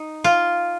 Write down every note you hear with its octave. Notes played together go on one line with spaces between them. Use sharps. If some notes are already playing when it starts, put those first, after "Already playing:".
Already playing: D#4
F4